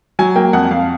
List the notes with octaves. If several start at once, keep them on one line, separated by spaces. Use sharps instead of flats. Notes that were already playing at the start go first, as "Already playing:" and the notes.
F#3 G#5
A#3 G5
F2 F#5
F2 F5